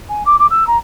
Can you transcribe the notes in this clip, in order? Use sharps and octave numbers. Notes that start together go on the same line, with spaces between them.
G#5
D6
D6
E6
A#5